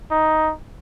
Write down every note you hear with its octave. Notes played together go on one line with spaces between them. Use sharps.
D#4